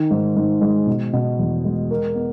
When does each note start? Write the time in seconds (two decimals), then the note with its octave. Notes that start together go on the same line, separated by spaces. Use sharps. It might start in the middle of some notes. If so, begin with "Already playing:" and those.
Already playing: D#3
0.11 G#2
0.36 G#2
0.61 G#3
0.87 B2
1.13 B2
1.39 E2
1.65 G#3
1.91 A#4
2.15 B3